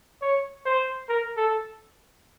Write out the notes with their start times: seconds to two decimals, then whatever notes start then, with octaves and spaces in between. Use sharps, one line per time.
0.22 C#5
0.65 C5
1.09 A#4
1.37 A4